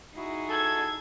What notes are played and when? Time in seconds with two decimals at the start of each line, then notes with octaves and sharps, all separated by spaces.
0.16 D#4 E4 F#4 G#4
0.49 A4 G#6